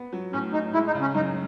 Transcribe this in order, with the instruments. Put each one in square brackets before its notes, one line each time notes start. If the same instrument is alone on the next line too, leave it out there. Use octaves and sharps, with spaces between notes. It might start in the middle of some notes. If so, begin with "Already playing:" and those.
Already playing: [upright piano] B3
F#3
[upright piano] A2 [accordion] C#4
[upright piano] A2 [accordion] D#4
[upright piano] G#3 [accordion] E4
[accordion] D#4
[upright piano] C#3
[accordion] C#4
[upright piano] F#2 [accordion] D#4